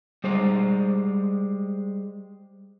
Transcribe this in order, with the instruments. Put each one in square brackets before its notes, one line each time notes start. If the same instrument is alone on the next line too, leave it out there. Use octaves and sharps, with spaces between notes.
[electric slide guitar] G3 G#3 C5